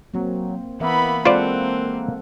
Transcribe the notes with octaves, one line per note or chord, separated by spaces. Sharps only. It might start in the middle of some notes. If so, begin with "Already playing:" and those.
F#3 A#3 C4
E3 A#3 B3 E5 B5
G#3 C4 F4 A4 C5 D5 F#5